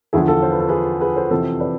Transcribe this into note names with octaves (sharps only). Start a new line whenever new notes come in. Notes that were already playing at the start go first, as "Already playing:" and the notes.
E2 D3 F3 E4 G#4
F4 A4
C5
B4
A4
G#4 B4
G#4 B4
A4 C5
F2 C3 E3 A4 C5
B4 D5